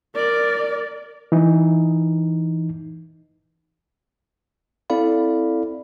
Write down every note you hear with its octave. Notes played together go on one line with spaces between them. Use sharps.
A#4 D5
E3 D#4
C4 E4 A4 D5 F5 B5